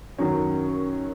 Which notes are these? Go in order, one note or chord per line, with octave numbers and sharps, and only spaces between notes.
F#2 D#3 F#3 C#4